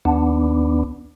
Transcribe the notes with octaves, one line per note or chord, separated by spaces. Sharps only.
D#2 B3 D4